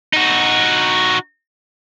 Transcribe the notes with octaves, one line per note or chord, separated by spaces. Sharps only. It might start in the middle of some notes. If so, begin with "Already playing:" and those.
D#4 F#4